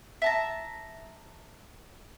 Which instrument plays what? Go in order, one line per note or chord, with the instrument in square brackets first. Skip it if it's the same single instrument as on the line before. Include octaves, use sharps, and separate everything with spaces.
[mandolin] E5 A5 A#5